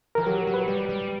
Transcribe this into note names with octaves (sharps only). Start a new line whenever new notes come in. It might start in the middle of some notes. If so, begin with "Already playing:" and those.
E3 A#4
F#3 G4
F#3
B4
G3
G3